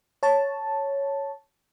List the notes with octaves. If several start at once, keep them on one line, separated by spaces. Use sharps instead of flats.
C#5 A5